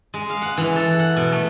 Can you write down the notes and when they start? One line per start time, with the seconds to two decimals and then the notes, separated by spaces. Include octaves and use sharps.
0.14 G#3
0.29 F5
0.42 F#5
0.57 E3
0.76 A4
0.99 F#5
1.16 B2
1.32 A3